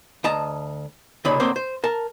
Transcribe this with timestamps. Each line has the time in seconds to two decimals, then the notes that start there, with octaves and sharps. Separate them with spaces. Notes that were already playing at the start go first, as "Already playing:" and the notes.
0.24 D2 D#5 A5 A#5
1.25 C2 A#2 C#3 D#4 B5
1.40 D2 A2 A#3 C4 C5
1.56 C5
1.84 A#4 A5